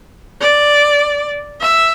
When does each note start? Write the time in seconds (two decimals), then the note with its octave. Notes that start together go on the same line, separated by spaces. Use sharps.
0.41 D5
1.61 E5